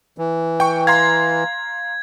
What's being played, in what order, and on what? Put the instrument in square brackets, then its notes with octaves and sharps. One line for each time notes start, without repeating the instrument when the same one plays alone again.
[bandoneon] E3
[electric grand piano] G5 C#6
[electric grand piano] F5 A#5 C6 [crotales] G#6